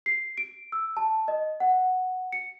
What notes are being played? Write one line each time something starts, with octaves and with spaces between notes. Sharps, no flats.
C7
D7
E6
A5
D#5
F#5
C#7